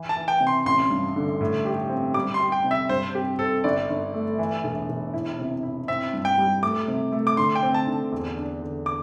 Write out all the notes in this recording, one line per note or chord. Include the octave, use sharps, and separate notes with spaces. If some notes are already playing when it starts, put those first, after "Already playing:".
Already playing: E3
A5
E3
G5
C3
C6
A1 C6
G2
D3
A2
G4
C4
G3 D6
C6
G4
G5
C3
E5
G2 C5
C4 G4
C4 A4
G1 D5
G1
A3
E3
E1
E1
E4
C3
E4
C4 E5
G2
G5
G3
A3 D6
C3
A3
D6
D3 C6
G5
C4
A5
D3
E2
D4
D3
D6